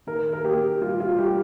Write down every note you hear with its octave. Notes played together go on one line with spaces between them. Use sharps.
D#3 A#4
A#4
A#3 G4
G3 F4
F4
G3 G4